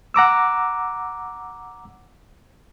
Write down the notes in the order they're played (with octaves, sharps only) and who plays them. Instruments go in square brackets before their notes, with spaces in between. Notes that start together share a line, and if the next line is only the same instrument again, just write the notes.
[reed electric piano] F#5 A#5 D6 E6